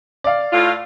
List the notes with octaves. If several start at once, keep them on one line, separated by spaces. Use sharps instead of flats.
D5 F5
A2 F4